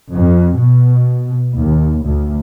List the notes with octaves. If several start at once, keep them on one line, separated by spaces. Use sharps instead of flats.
F2
B2
D#2
D2